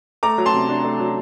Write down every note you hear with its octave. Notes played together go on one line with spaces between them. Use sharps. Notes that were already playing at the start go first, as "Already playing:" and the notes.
A3 A#5 D6
F#3
A5 C6
C3
D4
A3
F#3